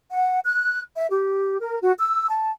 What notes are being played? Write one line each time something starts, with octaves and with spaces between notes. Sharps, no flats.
F#5
F#6
E5
G4
A#4
F#4
E6
A5